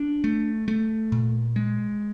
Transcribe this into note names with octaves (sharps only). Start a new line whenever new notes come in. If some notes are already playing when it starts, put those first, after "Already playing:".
Already playing: D4
A3
A3
A#2
G#3